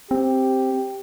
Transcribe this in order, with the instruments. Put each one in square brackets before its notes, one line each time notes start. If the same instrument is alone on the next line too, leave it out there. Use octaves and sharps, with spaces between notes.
[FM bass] C4 [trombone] G4